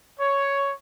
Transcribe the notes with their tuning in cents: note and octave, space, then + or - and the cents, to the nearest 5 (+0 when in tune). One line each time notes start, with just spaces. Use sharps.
C#5 +5